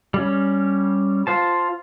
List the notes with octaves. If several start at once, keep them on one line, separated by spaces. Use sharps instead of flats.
G3 C#4
F4 C5 A5